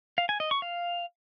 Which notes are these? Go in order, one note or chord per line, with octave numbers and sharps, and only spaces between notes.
F5
G#5
D#5
C#6
F5